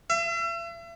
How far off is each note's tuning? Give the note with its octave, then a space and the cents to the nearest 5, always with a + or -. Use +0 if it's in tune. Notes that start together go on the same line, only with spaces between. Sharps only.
E5 +40